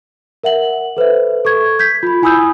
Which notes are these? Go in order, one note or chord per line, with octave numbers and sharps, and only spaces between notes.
A#4 E5 F#5 F#7
A4 B4 C5 E5
A4 C#6 G#6
G6 G#6 B6
F4 B5
E4 G#5 B5 D#6 E6 G6